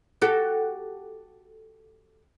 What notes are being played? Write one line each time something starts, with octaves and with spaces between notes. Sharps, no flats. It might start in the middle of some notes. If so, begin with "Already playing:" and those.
F#4 G4 A4